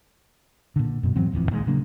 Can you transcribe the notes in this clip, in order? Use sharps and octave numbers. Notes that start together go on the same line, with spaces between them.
A#2 D3
F#2 B2
G#2 E3 F#3 C4
D#1 A1 F2 E3
A#2 D#3 F3 G#3
C#3 F#3 A#3 D4